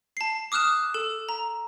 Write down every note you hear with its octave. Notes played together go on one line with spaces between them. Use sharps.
A5 C7
D6 D#6 F6 F#6 E7
A4 E7
A#5